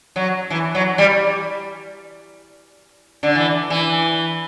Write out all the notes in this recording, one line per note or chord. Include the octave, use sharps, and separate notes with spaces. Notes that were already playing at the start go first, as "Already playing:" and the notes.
F#3
E3
F#3
G3
D3
E3
E3